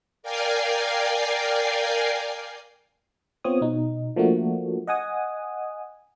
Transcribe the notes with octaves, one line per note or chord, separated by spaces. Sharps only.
A#4 D5 F5 G5 G#5 C7
B3 C4 F4 C#5 D#6
B2 D#4
F3 A3 A#3 D4 F#4
D#5 F#5 G#5 D#6